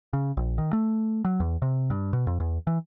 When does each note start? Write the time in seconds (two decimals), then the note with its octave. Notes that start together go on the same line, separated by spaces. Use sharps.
0.13 C#3
0.37 A#1
0.58 D#3
0.73 A3
1.25 F#3
1.40 E2
1.62 C3
1.90 G2
2.13 B2
2.27 F2
2.40 E2
2.67 E3